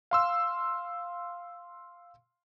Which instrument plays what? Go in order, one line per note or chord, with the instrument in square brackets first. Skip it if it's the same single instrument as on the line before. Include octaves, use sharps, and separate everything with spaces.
[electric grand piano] F5 C6 E6